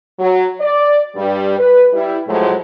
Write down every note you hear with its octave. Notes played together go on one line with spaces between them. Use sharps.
F#3
D5
G2 G3
B4
G3 E4
A2 C3 F3 F#3 G#3 A3